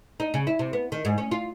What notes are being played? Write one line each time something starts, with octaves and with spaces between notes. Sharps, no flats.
D#4
C#3
E4
C3
B3
D#3
G#2
C#4
F4